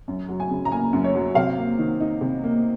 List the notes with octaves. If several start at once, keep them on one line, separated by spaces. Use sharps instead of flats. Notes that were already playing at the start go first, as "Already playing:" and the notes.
F#2
F#3
G#5
C#3
A#5
A#3 G#5
F#2
C#5
F#3
C3 F5
A#3
D#3
D#4
C3
A#3